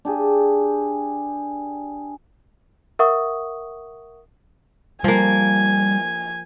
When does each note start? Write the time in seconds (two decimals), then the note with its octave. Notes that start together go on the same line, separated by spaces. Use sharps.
0.05 D4 G4 G#4
2.99 A#4 E5 F#5 C#6 D#6
5.04 F3 G3 A#3 G#5